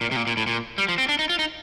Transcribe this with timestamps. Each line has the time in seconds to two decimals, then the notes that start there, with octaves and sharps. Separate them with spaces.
0.01 A#2
0.12 C3
0.16 A#2
0.27 A#2
0.37 A2
0.47 A#2
0.78 G3
0.88 F3
0.98 C4
1.09 D4
1.19 D#4
1.29 F4
1.39 D#4